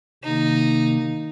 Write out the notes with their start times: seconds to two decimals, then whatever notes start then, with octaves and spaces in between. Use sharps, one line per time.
0.23 C3 D#3 A#3 D#4